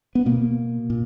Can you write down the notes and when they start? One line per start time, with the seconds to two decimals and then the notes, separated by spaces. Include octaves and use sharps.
0.15 B3
0.26 B2 A#3
0.90 A#2